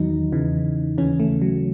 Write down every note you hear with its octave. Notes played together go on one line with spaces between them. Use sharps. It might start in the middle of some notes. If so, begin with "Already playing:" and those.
Already playing: E2 D#3 F#3 D#4
E2 C#3 E3
D#2 C#3 E3 C#4
A3
F#3